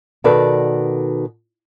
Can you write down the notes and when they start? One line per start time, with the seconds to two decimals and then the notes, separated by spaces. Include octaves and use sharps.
0.24 B2 D#3 F#4 A4 B4 D5